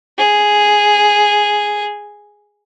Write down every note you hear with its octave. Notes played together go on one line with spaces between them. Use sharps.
G#4